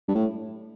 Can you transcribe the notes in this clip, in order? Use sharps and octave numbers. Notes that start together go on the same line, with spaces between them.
G2
A2